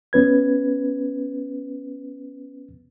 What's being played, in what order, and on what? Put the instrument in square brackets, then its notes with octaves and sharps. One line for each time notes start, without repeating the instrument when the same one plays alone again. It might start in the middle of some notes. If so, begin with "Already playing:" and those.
[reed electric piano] B3 C#4 B4 G#6